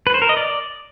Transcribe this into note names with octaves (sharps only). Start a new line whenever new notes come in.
B4
C5
A#4
D#5
D5